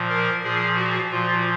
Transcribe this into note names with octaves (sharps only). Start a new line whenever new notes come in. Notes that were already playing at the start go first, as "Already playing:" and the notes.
Already playing: A#2 F3
A#4
A#2 F3 G#4
F#4
A#2 F3 F4